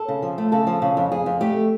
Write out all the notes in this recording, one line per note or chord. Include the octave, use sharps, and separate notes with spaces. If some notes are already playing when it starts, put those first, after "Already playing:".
Already playing: A4
C#3
F3
A3
C#3 A4
F3
C#3
F2
F2 G#4
F2
A3 G4